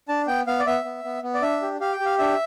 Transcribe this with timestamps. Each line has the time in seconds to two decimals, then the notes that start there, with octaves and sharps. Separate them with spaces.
0.09 D4 A5
0.27 B3 G5
0.47 B3 F5
0.59 D5
0.66 B3 E5
0.84 B3
1.04 B3
1.23 B3
1.34 D5
1.42 D4 E5
1.62 G4
1.80 G4 F5
1.92 G5
2.00 G4
2.05 F5
2.18 D4 E5